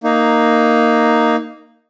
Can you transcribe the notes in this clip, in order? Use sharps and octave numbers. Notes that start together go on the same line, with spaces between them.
A#3 D#4